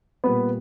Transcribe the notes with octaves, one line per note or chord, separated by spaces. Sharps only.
A#2 G3 A#3 B3 B4